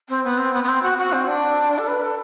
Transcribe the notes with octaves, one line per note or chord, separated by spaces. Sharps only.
C4
B3
C4
B3
B3
C4
F#4
F#4
C4
D4
A4
B4
A4